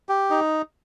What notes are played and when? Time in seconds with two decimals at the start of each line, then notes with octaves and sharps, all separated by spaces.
0.09 G4
0.30 D#4